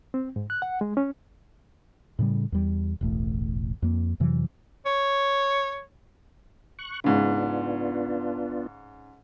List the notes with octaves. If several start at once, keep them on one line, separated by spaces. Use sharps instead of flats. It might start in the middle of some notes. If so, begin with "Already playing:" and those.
C4
G#2
F#6
F#5
G#3
C#4
A2 C#3 F#3 G3
E2 G3
E1 A1 A2
F2 A#3
F2 C3 E3 F#3
C#5
C#6 F#6
G#2 C#3 B3 D4 F4